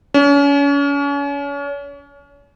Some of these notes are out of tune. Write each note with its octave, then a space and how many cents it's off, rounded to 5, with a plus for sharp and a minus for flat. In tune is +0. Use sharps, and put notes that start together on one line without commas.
C#4 +35